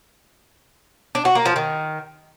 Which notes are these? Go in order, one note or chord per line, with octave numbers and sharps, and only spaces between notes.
D4
F#4
A#3
F3
D#3